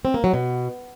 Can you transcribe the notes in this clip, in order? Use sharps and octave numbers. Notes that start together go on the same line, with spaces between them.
C4
A#3
F#3
B2